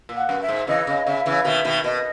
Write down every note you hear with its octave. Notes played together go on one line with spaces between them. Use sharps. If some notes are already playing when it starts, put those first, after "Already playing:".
A#2
F#5
F#2
E5
G#2
C#3 E3 D#5
C#3
C#3 E5
C#3 E3
B2 D#3 E5
B2 D#3
B2 D#5